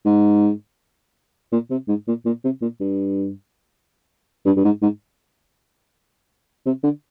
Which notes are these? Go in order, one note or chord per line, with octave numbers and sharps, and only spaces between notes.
G#2
A#2
C3
G#2
A#2
A#2
C3
A#2
G2
G2
G2
G#2
G#2
C3
D3